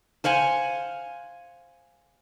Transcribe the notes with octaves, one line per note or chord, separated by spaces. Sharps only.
C5 F5 F#5 G#5